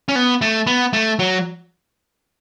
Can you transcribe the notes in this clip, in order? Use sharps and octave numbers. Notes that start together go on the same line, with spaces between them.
C#4
B3
A3
B3
A3
F#3